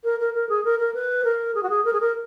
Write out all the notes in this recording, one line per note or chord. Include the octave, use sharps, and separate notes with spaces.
A#4
A#4
A#4
G#4
A#4
A#4
B4
A#4
G#4
F#4
G#4
A#4
G#4
A#4